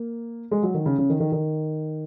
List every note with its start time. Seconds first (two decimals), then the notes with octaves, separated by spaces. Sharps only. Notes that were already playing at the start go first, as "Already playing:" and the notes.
Already playing: A#3
0.51 G#3
0.63 F#3
0.74 D#3
0.86 C#3
0.98 C#3
1.10 D#3
1.20 D#3
1.32 D#3